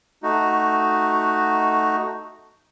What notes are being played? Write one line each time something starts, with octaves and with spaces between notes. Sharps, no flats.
A3 D#4 F#4